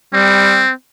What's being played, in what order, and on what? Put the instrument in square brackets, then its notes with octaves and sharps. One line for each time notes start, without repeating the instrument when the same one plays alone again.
[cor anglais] G3 [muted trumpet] C4